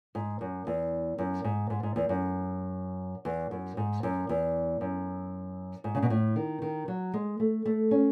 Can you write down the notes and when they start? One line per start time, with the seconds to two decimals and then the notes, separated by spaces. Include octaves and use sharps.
0.15 G#2
0.41 F#2
0.67 E2
1.18 F#2
1.44 G#2
1.70 G#2
1.83 G#2
1.96 E2
2.09 F#2
3.25 E2
3.51 F#2
3.77 G#2
4.03 F#2
4.29 E2
4.81 F#2
5.84 G#2
5.95 C#3
6.03 B2
6.10 A2
6.36 D#3
6.62 D#3
6.88 F#3
7.14 G#3
7.40 A3
7.66 A3
7.91 C#4